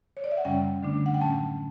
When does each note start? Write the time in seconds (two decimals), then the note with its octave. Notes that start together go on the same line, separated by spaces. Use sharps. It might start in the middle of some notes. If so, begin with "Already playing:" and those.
0.17 C#5
0.24 D5
0.31 E5
0.37 F#5
0.45 F#2 C#3 G3 C#4 G5
0.83 D3 A3 D4
1.06 F#5
1.14 G5
1.21 A2 F#3 C#4 A5